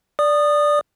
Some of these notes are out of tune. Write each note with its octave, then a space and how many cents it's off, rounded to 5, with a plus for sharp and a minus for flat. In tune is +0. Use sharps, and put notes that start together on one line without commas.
D5 +0 D#6 -20